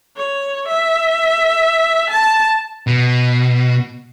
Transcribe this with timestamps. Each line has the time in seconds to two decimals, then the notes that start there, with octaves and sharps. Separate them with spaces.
0.17 C#5
0.68 E5
2.10 A5
2.87 B2